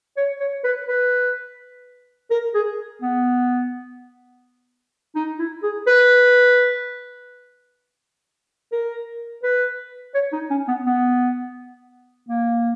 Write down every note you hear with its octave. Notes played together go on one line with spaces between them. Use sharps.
C#5
C#5
B4
B4
A#4
G#4
B3
D#4
E4
G#4
B4
A#4
B4
C#5
D#4
C#4
B3
B3
A#3